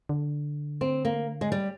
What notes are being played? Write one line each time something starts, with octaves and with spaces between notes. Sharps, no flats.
D3
C4
A#3
G#3
G3